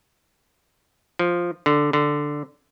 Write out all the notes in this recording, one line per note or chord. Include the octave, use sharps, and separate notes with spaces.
F3
D3
D3